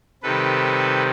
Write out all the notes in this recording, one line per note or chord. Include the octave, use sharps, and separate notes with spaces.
C3 D#3 G3 A4 B4